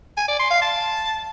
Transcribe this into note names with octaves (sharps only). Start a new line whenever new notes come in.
G#5
D5
C6
F5
A5